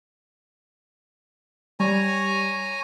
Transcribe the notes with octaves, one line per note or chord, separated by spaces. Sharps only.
G3 C#5 G#5 A#5